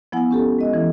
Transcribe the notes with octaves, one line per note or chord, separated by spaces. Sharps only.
F3 B3 E4 F#5 G#5
C#4 G4 A4
G#3 D#5
E3 E4 A4